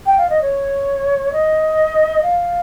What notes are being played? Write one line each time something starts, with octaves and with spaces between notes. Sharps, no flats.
G5
F5
D#5
C#5
D#5
F5